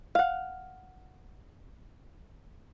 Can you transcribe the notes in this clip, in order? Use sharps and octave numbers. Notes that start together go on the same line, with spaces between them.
F5 F#5